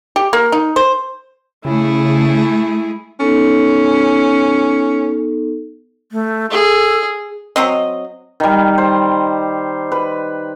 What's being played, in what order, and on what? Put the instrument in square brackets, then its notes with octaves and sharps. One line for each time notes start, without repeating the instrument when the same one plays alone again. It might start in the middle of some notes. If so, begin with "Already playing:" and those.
[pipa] G4
A#3
D#4
C5
[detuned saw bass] C#3 [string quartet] A3 G#4 [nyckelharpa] E4
[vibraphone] B3 D#4 A4 [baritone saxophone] C#4
[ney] A3
[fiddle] G#4 [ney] A4
[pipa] F#3 C4 D#5
[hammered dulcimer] D#3 G3
C5
B4